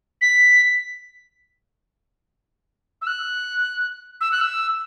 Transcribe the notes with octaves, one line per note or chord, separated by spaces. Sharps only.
B6
E6
F#6
E6
F#6
E6